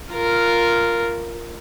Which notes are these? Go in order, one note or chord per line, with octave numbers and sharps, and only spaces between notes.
F4 A#4